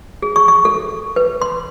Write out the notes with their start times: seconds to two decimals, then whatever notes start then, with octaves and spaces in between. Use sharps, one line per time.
0.22 G#4
0.36 C#6
0.48 C#6
0.65 A4
1.16 B4
1.42 C6